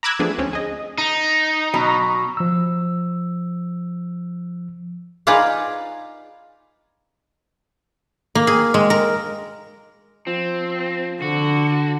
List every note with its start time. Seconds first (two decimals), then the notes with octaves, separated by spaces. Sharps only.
0.03 A#5 B5 D6 E6 F#6 G#6
0.19 F3 A3 B3 D4 G#4
0.38 D2 C4 C#4
0.53 G#4 D#5
0.98 D#4
1.74 B2 F#3
2.37 F3 E6
5.27 D#4 F4 G#4 B4 D5 F5
8.35 A#3
8.47 G#4
8.74 G#3
8.90 A#4
10.27 F3 C4
11.22 D3 F#4